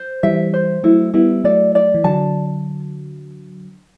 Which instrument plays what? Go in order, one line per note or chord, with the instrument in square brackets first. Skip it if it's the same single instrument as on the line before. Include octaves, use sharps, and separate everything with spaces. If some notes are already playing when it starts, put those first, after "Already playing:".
Already playing: [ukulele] C5
[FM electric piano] E3 G3 [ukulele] E5
[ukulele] C5
[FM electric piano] F#3 A3 [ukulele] E4
[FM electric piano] G3 B3 [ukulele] E4
[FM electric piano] F#3 A3 [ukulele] D5
[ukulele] D5
[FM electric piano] E3
[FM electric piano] D3 F#3 [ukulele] A5